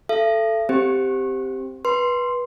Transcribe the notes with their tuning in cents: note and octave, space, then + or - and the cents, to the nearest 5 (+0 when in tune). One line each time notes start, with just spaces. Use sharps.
A4 +0 E5 +45
C4 -5 G4 +0 C5 +0
B4 -20 C6 +0